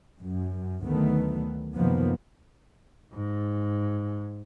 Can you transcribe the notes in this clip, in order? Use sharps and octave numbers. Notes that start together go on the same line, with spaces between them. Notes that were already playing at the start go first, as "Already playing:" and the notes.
F#2
D2 D#3 F#3 A3 B3
F#2 C3 D#3 F3 A#3 B3
G#2